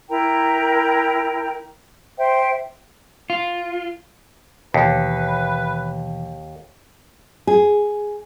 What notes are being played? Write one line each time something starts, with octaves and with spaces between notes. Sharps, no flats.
E4 A#4 G5 A#5
C5 E5 G5
F4
D#2 B2 E3 B4
G#4